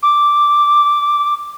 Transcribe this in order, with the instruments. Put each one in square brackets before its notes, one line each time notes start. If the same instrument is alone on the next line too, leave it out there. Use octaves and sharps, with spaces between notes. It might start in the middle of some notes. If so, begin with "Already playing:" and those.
[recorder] D6